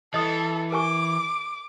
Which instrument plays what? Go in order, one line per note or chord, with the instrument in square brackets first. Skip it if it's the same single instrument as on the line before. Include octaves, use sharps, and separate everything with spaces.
[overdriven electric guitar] E3 [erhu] A4 [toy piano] D#5 D#6
[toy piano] A#4 G#5 C#6 [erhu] D6